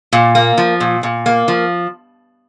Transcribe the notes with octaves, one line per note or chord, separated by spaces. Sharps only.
A#2
A#3
F3
A#2
A#2
A#3
F3